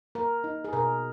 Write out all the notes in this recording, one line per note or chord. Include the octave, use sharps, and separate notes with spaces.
A#3 A#4
D#4
G#4
B2 A#4